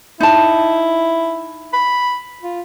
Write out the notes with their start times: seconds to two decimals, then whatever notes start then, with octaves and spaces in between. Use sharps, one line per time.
0.20 D#4 E4 A5
1.73 B5
2.42 F4